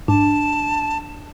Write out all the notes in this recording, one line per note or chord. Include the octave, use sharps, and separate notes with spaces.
G#2 D4 A5